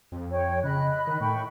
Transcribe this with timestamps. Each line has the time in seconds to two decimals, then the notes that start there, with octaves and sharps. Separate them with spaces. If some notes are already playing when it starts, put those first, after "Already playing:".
0.12 F2
0.30 C#5 G5
0.64 C#3 D#5 B5 F#6
1.07 D#3
1.20 A2 G5 B5 C#6